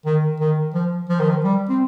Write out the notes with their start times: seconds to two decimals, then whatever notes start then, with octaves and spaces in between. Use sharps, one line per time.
0.06 D#3
0.40 D#3
0.74 F3
1.09 F3
1.20 D#3
1.30 F3
1.44 G3
1.69 C4